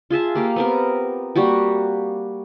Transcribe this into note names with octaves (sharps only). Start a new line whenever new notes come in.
F4 G#4 E5 A5
A#3 G4 F5
B3 C4 A#4
G3 A#3 F#4 G4